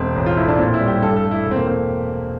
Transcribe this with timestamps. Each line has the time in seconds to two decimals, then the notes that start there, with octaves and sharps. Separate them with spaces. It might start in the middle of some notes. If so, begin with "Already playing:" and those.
Already playing: E1 C4
0.16 A1
0.26 F4
0.37 A2 E4
0.48 D4
0.59 A#2 C4
0.74 E4
0.80 G3
0.87 G4
1.02 G2 A4
1.16 A4
1.23 A3
1.31 E4
1.46 E1
1.51 C4
1.56 A#3
1.67 C4